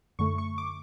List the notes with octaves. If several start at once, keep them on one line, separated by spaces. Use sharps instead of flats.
F#2 D3 A3 C#6
C#6
D6